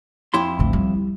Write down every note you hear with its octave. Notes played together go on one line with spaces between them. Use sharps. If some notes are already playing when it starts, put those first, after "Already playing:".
F2 E4 C6
A1 D2
G3